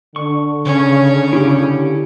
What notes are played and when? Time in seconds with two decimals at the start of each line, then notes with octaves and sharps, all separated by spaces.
0.16 D3 C#6
0.65 C#3 C#4
1.33 E4 G4